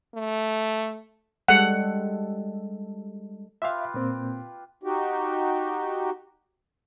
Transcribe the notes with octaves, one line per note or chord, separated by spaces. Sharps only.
A3
G3 G#3 A4 F#5
F4 G4 B4 E5 F5
A#2 A#3 C4
D#4 F#4 G4